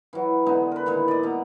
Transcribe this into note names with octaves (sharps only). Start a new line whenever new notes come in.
E3 F#3
D3 G#3 B3 D#4
A#4 B4
A#2 D#3 E3 G#3
D5 D#5
B2 A#5